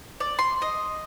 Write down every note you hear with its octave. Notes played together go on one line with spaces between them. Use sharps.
D5
C6
D#5